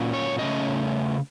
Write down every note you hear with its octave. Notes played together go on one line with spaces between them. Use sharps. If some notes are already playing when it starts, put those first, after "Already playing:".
Already playing: A#2 F#3 A#3 C#4
C#5
C#3 A3 C#4 D#5